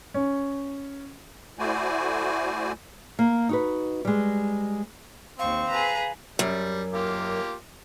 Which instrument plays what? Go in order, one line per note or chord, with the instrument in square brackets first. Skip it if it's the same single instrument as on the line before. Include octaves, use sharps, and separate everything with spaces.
[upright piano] C#4
[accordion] A3 E4 F#4 C5 D5 G#5
[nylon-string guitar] A#3
D#4 F#4 B4
G3 G#3
[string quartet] D#2 C#6 [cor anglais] C4 [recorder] F5
[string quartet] G#4 B4 A#5
[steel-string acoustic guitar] F#2 [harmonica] G3
[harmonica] A#3 F4 G4